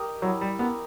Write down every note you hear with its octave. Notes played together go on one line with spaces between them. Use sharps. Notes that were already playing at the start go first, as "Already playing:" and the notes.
Already playing: G4 A#4 D#5
F#3 E4
G3
B3 G4 A#4 D#5